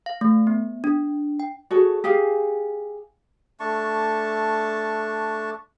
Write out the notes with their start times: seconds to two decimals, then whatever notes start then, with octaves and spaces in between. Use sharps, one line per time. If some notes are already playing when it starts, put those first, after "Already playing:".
0.06 F5
0.21 A3
0.47 B3
0.84 D4
1.40 G5
1.71 F#4 G#4 A4 C#5
2.04 G4 G#4 F5 G#5
3.60 A3 D4 A5 C#6